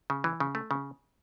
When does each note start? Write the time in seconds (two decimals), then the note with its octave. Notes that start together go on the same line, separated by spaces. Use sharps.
0.10 C#3
0.24 E3
0.40 C#3
0.55 A3
0.71 C#3